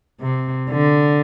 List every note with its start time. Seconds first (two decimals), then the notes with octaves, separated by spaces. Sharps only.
0.20 C3
0.70 D3